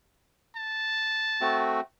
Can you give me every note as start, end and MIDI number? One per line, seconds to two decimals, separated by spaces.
0.56 1.71 81
1.41 1.81 57
1.41 1.81 60
1.41 1.81 66